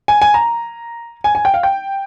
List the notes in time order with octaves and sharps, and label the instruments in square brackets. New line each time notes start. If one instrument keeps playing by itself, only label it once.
[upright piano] G#5
G#5
A#5
G#5
G#5
G5
F5
G5